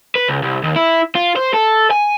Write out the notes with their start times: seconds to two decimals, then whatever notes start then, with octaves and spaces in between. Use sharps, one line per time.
0.16 B4
0.29 C#2
0.43 C2
0.64 D#2
0.76 E4
1.15 F4
1.36 C5
1.54 A4
1.91 G#5